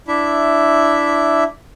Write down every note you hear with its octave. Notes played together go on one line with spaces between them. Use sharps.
D4 E4 E5